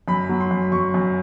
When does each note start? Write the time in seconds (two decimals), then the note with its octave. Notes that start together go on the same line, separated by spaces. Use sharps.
0.08 F#2 B5
0.29 F#3
0.40 C6
0.51 F#2
0.72 F#2 C#6
0.94 F#2